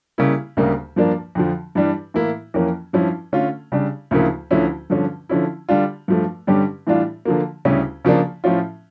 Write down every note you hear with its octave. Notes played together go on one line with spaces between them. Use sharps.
C#3 G3 A#3 E4
D2 C#3 G3 A#3
G2 F3 A#3 D4
F2 D3 F3
G2 E3 G3 D4
A2 E3 A#3 E4
F2 E3 A#3 C#4
G2 F3 C#4 E4
D3 A3 C#4 F4
C#3 G3 D4
D2 C#3 F3 A#3 E4
D2 D3 F3 C#4 E4
G2 D3 F3 C#4
D3 F3 C#4 E4
D3 G3 D4 F4
G2 F3 A3
G2 D3 G3 C#4 G4
A2 E3 G3 D4 F4
D3 F3 A#3
D2 C#3 G3 C#4 E4
C#3 F3 A#3 D4
A2 F3 C#4 F4